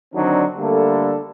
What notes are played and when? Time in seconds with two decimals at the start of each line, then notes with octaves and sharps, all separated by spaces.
0.14 D3 D#3 F#3 C4 D4 D#4
0.58 D3 G3 A3 A#3 A4